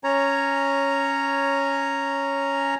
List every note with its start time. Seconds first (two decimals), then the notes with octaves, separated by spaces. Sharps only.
0.04 C#4 C#5 A#5